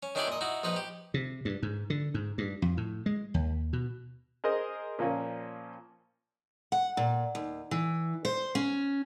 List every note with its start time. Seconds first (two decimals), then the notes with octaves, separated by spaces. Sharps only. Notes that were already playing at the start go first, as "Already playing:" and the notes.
0.03 C#4
0.15 D#3 C#4 D4 E4 G4 D5
0.27 A#2 D#5
0.41 D#4 E4 F#4
0.63 A#1 F3 D#4 B4
0.76 G4
1.14 C3
1.45 G2
1.63 G#2
1.90 D3
2.14 G#2
2.38 G2
2.62 F2
2.77 A2
3.06 G#3
3.34 D#2
3.73 B2
4.44 G#4 A#4 C5 D#5
4.99 A#2 F3 A#3 C#4
6.72 F#5
6.97 A#2
7.35 D#2
7.71 E3
8.25 C5
8.55 C#4